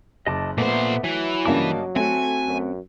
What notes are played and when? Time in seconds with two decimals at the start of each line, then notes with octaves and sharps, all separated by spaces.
0.26 F#1 D#5 A5 D6
0.58 A#2 A3 B3 C5 E5 D6
1.04 E3 F#3
1.46 G2 C#3 A#3 D#5 A5 D6
1.96 A3 C4 F#4 G#5
2.46 F#2